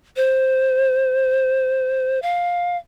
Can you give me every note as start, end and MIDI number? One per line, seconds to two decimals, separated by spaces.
0.16 2.21 72
2.22 2.77 77